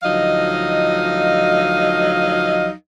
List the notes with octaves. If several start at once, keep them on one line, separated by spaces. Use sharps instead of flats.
D2 F3 F#3 D#4 D#5 F5